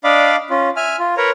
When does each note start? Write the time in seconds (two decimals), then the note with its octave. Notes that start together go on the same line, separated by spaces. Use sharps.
0.04 D4 D5 D#5 F5 B5 D6
0.50 C#4 F4
0.77 E5 G#5 F6
0.99 F4
1.17 A#4 B4 C#5 A#5